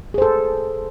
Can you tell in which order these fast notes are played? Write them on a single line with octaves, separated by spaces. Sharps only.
G#4 C5 A4